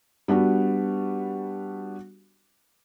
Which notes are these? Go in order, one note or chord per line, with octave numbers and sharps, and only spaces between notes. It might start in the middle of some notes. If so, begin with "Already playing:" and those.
G3 B3 D4 F#4